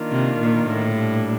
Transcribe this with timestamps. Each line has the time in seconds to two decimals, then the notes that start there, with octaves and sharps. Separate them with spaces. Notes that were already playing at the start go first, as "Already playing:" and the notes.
Already playing: D#3 A#3 D4 F4
0.11 C3
0.39 A#2
0.67 A2
0.95 A#2 G3 D4